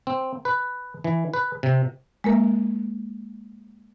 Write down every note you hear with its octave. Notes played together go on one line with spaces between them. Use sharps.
C4
B4
E3
B4
C3
G#3 A#3 A#4